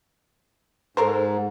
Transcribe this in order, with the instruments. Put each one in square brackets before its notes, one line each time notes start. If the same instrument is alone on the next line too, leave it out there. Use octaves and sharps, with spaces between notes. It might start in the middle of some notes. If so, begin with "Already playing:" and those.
[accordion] G#2 [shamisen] A4 A#4 C5